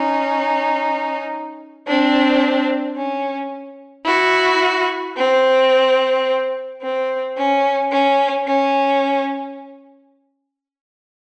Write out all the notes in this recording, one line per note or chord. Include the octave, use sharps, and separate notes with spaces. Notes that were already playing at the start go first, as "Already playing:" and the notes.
Already playing: C#4 D#4
C4 D4
C#4
E4 F#4
C4
C4
C#4
C#4
C#4